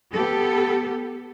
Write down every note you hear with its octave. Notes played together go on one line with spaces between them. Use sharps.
B3 G4 A4